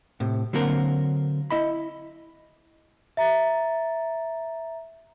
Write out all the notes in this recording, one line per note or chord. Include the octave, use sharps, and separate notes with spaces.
A2 C3
D3 F#3 A#3 C4 A#4
E4 D#5 B5
E5 A#5 A6